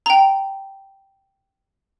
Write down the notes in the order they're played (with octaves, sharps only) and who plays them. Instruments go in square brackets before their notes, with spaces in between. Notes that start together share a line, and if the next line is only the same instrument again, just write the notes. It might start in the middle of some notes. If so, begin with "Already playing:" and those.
[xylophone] G5 A#5